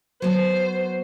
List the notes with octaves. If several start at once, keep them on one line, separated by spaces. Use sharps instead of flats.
F#3 B3 C5